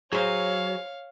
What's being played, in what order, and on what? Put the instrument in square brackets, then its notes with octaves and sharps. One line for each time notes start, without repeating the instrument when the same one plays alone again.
[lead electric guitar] F#3 [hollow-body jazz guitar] G#4 C5 [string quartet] C#5 F5